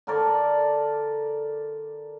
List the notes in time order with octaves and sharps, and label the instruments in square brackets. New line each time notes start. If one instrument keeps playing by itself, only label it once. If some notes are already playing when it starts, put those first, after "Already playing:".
[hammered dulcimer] D3 A#4 D5